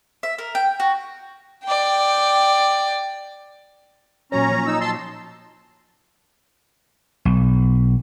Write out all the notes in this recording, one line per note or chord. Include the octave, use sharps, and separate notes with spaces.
E5
A#4
G5
F#4
D5 G5
A#2 F#3 C#4 C#5 A#5
F3
D#4 E6
A5 C6 E6
B1